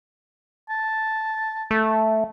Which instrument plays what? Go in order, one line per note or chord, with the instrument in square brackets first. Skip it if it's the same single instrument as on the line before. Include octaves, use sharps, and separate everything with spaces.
[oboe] A5
[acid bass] A3